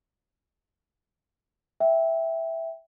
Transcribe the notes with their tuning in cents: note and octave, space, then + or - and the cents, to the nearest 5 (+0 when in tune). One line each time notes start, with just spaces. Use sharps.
E5 +0 G5 +5